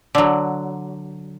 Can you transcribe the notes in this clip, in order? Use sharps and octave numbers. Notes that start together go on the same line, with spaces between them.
D3 F#3